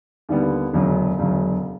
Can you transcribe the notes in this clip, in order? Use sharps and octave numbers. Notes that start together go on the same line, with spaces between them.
D#2 D3 G3 B3
E1 D2 C#3 F#3
E1 D2 C#3 F#3